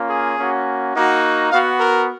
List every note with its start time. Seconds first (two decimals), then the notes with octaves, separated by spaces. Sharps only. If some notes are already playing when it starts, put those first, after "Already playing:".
Already playing: A#3 C#4 F4
0.09 G#4
0.37 A#3 C#4 F#4
0.95 A#3 D#4 F#4
1.51 B3 F#4 F5
1.80 A#4